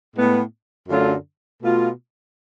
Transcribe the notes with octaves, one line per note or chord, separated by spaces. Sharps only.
A2 G#3 B3
F#2 D3 F#3 A3 F4
B2 A3 F4